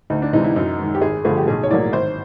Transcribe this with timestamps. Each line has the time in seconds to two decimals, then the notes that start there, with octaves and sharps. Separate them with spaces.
0.10 D2 D#4
0.22 D4
0.33 C3 E3 G#3 D#4
0.44 E4
0.56 F#2 D#4
0.79 D#3 G#3
0.95 G4
1.01 G#1 G#4
1.25 G2 D3 F3 A3 G#4
1.37 G4
1.48 B1 G#4
1.63 C#5
1.70 A2 F#3 A#3 D5
1.93 G#1 C5